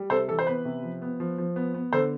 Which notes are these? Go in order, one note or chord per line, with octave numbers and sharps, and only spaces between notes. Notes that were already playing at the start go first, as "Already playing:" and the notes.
Already playing: G3
C3 A4 C5
E3 A4
C5
B3 B4
C3
F3
B3
F3
F3
B3
B3
D3 A4 C5